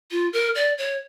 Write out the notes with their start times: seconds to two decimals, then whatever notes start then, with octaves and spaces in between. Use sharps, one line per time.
0.11 F4
0.33 A#4
0.55 D5
0.78 C#5